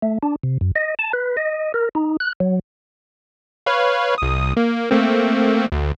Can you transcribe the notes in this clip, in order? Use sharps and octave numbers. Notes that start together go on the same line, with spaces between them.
A3
D4
C3
F#2
D#5
A5
B4
D#5
A#4
D#4
F#6
F#3
B4 C#5 F5
C2 D#6
A#3
A3 A#3 C4
D2